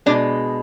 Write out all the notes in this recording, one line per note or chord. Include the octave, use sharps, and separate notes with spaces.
B2 G#3 D4